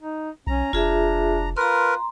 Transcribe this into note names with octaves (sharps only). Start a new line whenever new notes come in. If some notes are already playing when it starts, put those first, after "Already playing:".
D#4
B1 C#4 A#5
F1 D4 F4 G#4 E5
F4 A#4 B4 A#5 C6